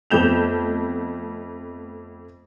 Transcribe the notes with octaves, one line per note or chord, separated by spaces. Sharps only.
F2 A3 B3 G6 E7 F7